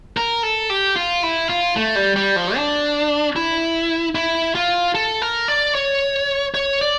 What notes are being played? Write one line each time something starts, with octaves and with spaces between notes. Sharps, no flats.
A#4
A4
G4
F4
E4
F4
A3
G3
G3
F3
D4
E4
E4
F4
A4
A#4
D5
C#5
C#5
D5